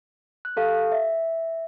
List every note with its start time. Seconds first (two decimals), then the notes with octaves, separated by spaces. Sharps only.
0.45 F#6
0.57 G4 A4 F5
0.92 E5